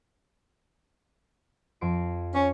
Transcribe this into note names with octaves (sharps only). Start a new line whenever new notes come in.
F2 C6 D7
C#4 C#5